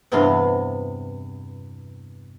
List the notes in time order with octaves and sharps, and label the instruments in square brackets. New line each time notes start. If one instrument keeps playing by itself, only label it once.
[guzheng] E2 G2 C3 B3 F5 C6